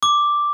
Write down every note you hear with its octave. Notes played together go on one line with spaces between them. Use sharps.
D6